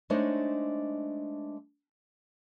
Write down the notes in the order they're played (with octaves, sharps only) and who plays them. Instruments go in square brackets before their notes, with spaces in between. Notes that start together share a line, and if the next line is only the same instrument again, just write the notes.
[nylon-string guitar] G#3 A3 D4 D#4 C5 C#5